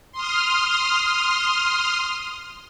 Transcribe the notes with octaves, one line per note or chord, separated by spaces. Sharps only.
C6 D#6 F6